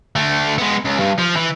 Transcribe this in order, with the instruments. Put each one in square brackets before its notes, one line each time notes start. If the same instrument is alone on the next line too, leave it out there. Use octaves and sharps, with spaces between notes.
[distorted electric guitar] D3 A3
G#3 B3
C#2
G2
F3
E3